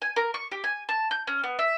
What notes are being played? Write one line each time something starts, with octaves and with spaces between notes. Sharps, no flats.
G#5
A#4
C#6
G4
G#5
A5
G6
C#4
B3
E5